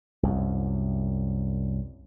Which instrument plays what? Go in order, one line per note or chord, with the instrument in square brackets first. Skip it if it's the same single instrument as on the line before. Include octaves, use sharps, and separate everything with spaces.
[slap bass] C2 F#2